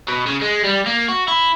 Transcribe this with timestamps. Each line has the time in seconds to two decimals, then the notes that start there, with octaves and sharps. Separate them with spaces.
0.08 B2
0.27 C#3
0.41 G#3
0.64 G3
0.86 A#3
1.09 F#4
1.28 E4